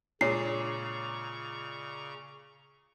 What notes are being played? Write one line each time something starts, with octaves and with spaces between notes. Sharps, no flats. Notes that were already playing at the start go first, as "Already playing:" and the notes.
A#2 C#3 G#3 D4 C#5 A#5 C#6 C7